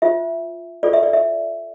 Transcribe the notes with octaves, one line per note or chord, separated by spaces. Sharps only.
F4 C5 E5
F4 A4 C5 D5
E5
D5
E5